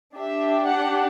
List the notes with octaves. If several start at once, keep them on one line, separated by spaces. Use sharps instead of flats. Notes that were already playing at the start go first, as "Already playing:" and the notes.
D4 G4 E5
F#5